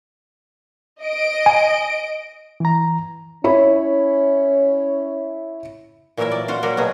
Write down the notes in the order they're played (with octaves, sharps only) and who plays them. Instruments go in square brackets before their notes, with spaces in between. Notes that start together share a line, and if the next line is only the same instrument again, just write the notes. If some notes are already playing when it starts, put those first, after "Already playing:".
[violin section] D#5 D7
[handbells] G#5
[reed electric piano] E3 A#5
[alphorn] C#4 [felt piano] E4 C#5 B5
[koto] A#2 E3 F#3 E4 A#4 E5
D5
F4 F#4 C5 F5
F#3 G3 A#3 F#4 A#4
B2 F#3 B3 G#4